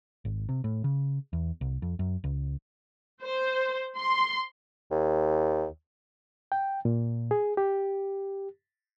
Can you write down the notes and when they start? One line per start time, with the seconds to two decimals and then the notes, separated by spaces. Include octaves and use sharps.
0.25 G#1
0.49 C3
0.64 A2
0.84 C#3
1.33 E2
1.61 C2
1.82 F2
1.99 F#2
2.24 C#2
3.23 C5
3.98 C6
4.91 D#2
6.52 G5
6.85 A#2
7.31 G#4
7.57 G4